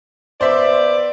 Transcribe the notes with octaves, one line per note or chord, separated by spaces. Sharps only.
B3 C5 D5 E5